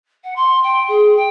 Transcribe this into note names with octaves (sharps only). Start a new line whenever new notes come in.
F#5
C6
G5
G#4
G5